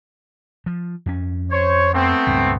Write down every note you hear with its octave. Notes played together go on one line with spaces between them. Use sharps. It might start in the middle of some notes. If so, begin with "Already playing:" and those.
F3
F2 C#4
C5 C#5
A3 B3 C4
C#2 G2 A#2